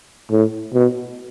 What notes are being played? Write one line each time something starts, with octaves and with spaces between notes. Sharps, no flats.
A2
B2